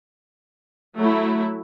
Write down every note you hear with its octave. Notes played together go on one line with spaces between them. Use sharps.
F#3 A3 E4